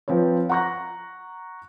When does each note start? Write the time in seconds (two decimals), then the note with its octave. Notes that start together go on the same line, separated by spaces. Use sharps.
0.08 F3 C4 B4 C#5
0.49 F#5 A#5 C#6 F#6 A#6